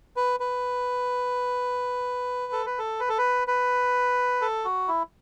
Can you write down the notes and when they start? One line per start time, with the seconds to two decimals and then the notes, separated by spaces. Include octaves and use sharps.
0.16 B4
0.40 B4
2.52 A4
2.66 B4
2.79 A4
3.00 B4
3.09 A4
3.18 B4
3.48 B4
4.41 A4
4.65 F#4
4.88 E4